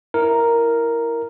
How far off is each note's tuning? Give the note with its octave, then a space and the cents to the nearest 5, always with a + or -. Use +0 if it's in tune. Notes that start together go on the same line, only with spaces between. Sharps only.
E4 +0 A#4 +0